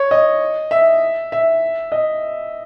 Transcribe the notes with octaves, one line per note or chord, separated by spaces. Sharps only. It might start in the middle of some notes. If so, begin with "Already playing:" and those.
Already playing: C#5
D#5
E5
E5
D#5